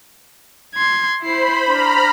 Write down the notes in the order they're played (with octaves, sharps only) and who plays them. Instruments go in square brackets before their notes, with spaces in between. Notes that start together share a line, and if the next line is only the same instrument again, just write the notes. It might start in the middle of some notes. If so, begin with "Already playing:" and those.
[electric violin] C6 G#6
[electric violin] E4 C7 [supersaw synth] C5 B5
[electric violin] D4 [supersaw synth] A#5 B5 F6